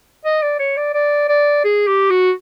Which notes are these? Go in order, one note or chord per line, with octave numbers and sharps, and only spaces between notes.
D#5
D5
C#5
D5
D5
D5
G#4
G4
F#4